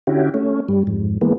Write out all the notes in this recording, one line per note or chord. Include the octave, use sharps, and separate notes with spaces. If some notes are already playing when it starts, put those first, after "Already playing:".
D3 C#4 E4 F#4 G4
A3 C#4
G2 G3
F2 G#2
E3 G#3 A#3 B3